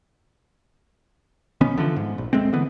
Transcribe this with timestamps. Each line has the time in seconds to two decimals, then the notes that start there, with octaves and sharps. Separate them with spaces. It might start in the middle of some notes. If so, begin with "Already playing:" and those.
1.61 B1 D#3 B3 C#4
1.77 D3 E3 F3
1.96 G#2
2.18 A#1
2.33 D#1 G#3 A3 C4
2.53 D3 E3 B3